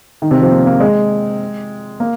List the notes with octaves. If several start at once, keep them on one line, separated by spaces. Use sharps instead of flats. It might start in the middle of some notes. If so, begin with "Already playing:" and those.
D#3
C3
F3
A#3
A#3
G#3
A#3